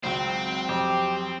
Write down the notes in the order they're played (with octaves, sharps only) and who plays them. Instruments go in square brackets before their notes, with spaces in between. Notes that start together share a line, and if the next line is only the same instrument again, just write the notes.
[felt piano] G#1 C#2 [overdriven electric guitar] F#3 [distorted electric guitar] C4
[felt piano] F2 [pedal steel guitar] G4